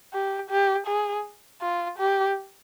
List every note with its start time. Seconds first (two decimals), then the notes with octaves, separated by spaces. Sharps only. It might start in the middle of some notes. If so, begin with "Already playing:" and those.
0.13 G4
0.50 G4
0.87 G#4
1.62 F4
1.99 G4